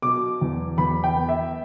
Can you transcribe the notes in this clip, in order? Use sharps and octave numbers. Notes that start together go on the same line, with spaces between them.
B2 D6
E2
E2 B5
G5
B3
E5